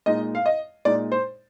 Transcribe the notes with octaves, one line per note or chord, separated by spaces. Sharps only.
A#2 G#3 D#4 D#5
F5
D#5
A#2 G#3 D#4 D5
C5